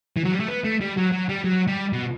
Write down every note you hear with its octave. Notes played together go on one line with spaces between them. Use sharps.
E3
F#3
G3
A3
B3
A3
G3
F#3
F#3
G3
F#3
G3
B2